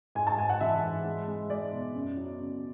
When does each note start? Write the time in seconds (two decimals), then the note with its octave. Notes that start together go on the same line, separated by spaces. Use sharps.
0.15 G#2 G#5
0.27 A5
0.37 G#2 G#5
0.49 F#5
0.60 E3 E5
0.83 G#2
1.05 G#3
1.28 G#3
1.50 G#3 D5
1.73 B2
1.95 F#2
2.17 F#3
2.40 C#3